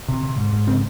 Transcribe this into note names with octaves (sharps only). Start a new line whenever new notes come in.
C3
C3
G#2
G#2
C#3 C4